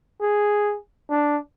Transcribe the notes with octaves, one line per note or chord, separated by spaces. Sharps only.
G#4
D4